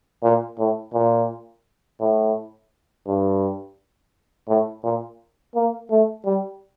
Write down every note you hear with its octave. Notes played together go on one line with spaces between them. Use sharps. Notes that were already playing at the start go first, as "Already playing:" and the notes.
A#2
A2
A#2
A2
G2
A2
A#2
A#3
A3
G3